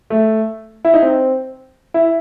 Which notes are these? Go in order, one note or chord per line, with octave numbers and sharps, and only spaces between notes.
A3
E4
D#4
C4
E4